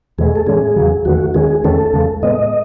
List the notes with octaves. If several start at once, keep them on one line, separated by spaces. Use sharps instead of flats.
E2 B2 A3 G#4
A4
A2 E3 G#3 C#4 G#4
E2 C#3 F#3
E2 D#3 A3 F#4
D#2 D#3 G#3 C#4 G#4
E2 D#3 A3 C#4 A4
E2 C#3 G#3
A2 G#3 B3 D#5